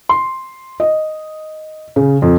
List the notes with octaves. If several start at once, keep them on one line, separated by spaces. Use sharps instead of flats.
C6
D#5
C#3
F2